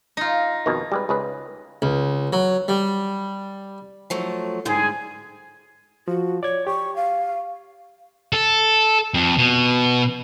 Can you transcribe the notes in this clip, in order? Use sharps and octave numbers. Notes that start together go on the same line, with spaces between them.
D#4 F4
F2 B2 D#3
G3 G#3 B4
C#2 G#4 B4
C#2
F#3
G3
F3 F#3 A3
G#2 D3 G3 G#4
F3 F#4
C#5 D5 G#6
G4 C#6
F5
A4
F2
B2